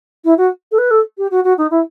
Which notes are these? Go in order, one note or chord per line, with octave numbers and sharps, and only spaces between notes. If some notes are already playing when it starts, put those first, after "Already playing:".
E4
F#4
A4
B4
A4
G4
F#4
F#4
D#4
E4